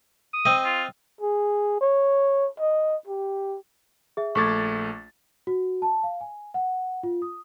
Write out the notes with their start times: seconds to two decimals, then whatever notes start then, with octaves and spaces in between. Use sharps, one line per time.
0.33 D#6
0.45 C4 D#5
0.65 F4
1.21 G#4
1.81 C#5
2.59 D#5
3.07 G4
4.17 G#4 E5
4.35 A#1 A3 C#6 D6 G#6 A6
5.47 F#4
5.82 A5
6.03 F5
6.21 G#5
6.54 F#5
7.03 F4
7.22 D#6